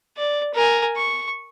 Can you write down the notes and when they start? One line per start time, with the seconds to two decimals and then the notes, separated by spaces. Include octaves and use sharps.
0.17 D5
0.54 A#4 G#5
0.97 C#6